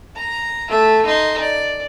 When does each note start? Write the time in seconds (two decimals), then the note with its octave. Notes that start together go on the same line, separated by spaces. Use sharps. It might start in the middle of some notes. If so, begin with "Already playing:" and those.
0.16 A#5
0.69 A3 E5
1.06 D#4 C6
1.41 D5